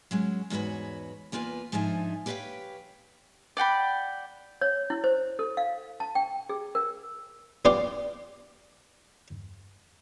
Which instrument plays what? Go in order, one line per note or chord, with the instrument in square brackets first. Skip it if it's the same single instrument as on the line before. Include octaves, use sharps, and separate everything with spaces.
[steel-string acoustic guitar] F#3 G#3 C#4
E2 G#2 F#4 B4 C#5
E2 A#3 F4 B4 G#5
G#2 F3 D4 D#4 E5 G#5
G4 B4 C#5 D#5 F5 G5
[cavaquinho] D5 F#5 G5 B5
[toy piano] C#5
E4
C5
A4
F5
A5
G5
G#4
A#4
[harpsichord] B3 F4 G4 D5 F5 G5